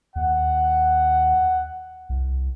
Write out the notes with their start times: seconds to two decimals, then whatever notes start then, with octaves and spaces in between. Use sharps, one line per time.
0.16 D#2 F#5
2.09 C2